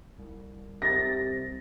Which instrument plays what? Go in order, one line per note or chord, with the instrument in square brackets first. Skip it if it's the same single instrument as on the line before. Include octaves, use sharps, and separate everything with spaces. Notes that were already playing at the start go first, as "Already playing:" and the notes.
[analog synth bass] C2
[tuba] C3 [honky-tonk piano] A6 A#6